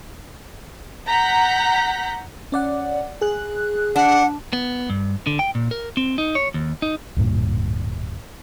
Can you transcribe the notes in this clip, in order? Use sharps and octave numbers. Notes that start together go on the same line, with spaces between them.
F#5 A#5 G6 B6
C#4 D5 F#5
G#4 F#6
D4 F#5
B3
G2
D3
G5
A#2
A#4
C4
D#4
C#5
D#2
D#4
D1 G2 A#2